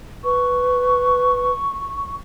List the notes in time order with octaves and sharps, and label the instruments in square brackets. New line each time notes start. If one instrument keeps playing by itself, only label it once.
[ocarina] B4 [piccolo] C#6